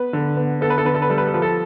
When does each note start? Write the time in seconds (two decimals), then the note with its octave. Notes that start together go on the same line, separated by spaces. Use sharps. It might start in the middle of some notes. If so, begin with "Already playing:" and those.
Already playing: B3 B4
0.13 D3
0.37 B3
0.61 B3 A4
0.70 B4
0.78 A4
0.85 D3 B4
0.95 A4
1.02 B4
1.10 G3 A4
1.18 B4
1.27 A4
1.34 F3 B4
1.42 A4